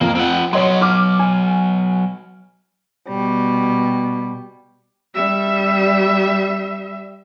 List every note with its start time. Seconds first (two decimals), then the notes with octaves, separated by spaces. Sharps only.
0.01 F2 A#3
0.15 C4 F#5
0.53 F#3 B3 C#5 D#5 C6
0.81 D6 F6
1.19 G#5
3.09 B2 G3
5.14 G3 E5